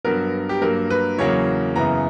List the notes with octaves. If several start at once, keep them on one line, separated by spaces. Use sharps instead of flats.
G2 F#3 B3 A#4
G4
G2 F#3 A#3 A#4
B4
E2 C#3 F#3 A#3 C#5
F#2 C#3 E3 B3 A#5